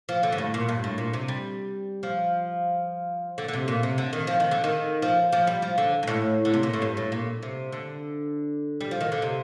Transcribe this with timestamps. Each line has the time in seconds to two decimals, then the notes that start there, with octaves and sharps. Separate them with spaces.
0.09 F3
0.23 D3
0.32 G2
0.38 A2
0.54 A#2
0.69 G2
0.84 A2
0.98 A#2
1.13 C3
1.28 G3
2.03 F3
3.38 D3
3.48 D3
3.53 C3
3.68 A#2
3.83 C3
3.98 D3
4.13 D#3
4.27 F3
4.40 D#3
4.51 D3
4.64 D#3
5.02 F3
5.32 F3
5.47 G3
5.62 F3
5.78 D3
6.03 G2
6.07 A2
6.45 D3
6.54 C3
6.63 A#2
6.74 A2
6.82 G2
6.97 A2
7.12 A#2
7.43 C3
7.72 D3
8.81 G3
8.91 F3
9.01 D#3
9.12 D3
9.22 C3